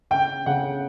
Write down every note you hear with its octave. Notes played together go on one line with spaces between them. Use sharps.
C#3 G5
C#3 F#5